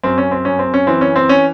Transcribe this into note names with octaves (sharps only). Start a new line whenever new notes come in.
F#2 C4
C#4
C4
F#2 C#4
C4
C#4
E3 C4
C#4
C4
C#4